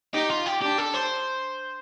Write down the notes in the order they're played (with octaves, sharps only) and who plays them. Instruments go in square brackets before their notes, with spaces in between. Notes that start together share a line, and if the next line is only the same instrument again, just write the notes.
[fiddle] D#4 [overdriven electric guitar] G4
[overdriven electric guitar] F4
G4
[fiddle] D4 [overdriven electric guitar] G4
[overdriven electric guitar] A4
C5